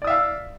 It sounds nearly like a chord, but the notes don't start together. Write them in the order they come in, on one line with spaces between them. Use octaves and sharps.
D5 D#6 E5 F5 E6